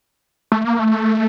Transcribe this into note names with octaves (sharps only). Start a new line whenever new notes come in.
A3
A#3
A3